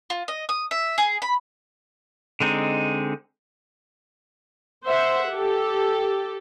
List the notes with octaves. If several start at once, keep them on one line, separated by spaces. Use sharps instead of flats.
F4
D#5
D#6
E5
G#4
B5
D3 G#3 C4 D#4
C5 E5 F#5
G4 A4